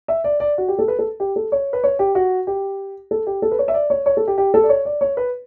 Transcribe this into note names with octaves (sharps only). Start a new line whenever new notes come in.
E5
D5
D5
F#4
G4
A4
B4
A4
G4
A4
C#5
B4
C#5
G4
F#4
G4
A4
G4
A4
B4
C#5
E5
D5
C#5
C#5
A4
G4
G4
A4
D5
C#5
D5
C#5
B4